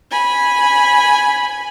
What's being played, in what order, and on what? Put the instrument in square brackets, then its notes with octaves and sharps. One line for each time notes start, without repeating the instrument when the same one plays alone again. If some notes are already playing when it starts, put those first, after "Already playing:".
[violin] G#5 B5